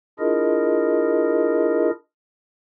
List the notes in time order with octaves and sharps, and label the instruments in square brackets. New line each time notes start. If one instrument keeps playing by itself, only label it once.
[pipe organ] D4 E4 F4 G#4 A#4 D#5